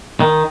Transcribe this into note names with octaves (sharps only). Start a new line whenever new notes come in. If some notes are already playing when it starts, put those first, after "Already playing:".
D#3